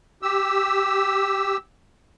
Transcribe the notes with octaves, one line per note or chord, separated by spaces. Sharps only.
G4 E6